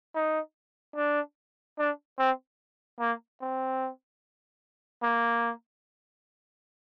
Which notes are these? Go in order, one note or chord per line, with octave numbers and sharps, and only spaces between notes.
D#4
D4
D4
C4
A#3
C4
A#3